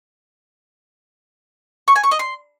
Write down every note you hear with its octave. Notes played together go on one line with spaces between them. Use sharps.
C#6
G#5
C#6
D#5
C6